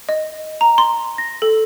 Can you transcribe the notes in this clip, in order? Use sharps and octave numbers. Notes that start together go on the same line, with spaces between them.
D#5
A#5
C6
A#6
A4